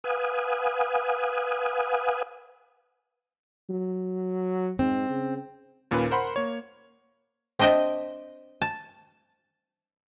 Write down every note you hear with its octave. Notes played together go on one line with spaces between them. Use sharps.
B4 F5 F#5 G#5 D#6
F#3
G#2 C4
C#3
D#2 A#2 C#4 F4 B4
A#4 C5 F#5 B5 C6
A#3 C#5
C4 D4 D#5 E5 G5
A5